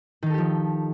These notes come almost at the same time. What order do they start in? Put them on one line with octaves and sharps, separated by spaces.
D#3 D#4 A4 G4 F3